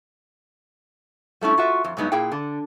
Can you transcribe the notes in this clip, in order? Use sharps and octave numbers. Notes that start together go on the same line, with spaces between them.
G3 A3 C#4 E4
F4 F#4 E5
F2
G2 F#3 G#3 B3 D#4 E4
A#2 A#3 E4 G#4 G5
D3